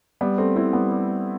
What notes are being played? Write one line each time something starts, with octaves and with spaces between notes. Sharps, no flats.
G3 B3
A3 C4
C4 E4
G3 B3
G3